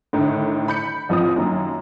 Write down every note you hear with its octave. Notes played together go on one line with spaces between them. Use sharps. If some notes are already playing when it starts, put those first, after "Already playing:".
A2 D3 D#3
B5 G6 C#7
A1 F2 F3 C4 D#6
F#2 D#3 A#3